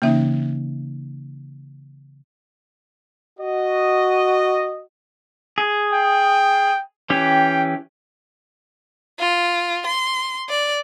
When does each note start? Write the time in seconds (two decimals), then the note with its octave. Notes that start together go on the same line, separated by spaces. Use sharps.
0.02 C#3 E3 A#3 C#4 D#4 E5
3.39 F#4 D#5
5.58 G#4
5.93 G5
7.10 E3 C#4 G4 G5
9.19 F4
9.87 C6
10.49 D5